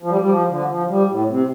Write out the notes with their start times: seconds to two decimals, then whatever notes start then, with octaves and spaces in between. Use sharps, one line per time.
0.03 F3
0.10 G3
0.21 G3
0.29 F3
0.50 D3
0.69 F3
0.89 G3
1.09 A2
1.28 C3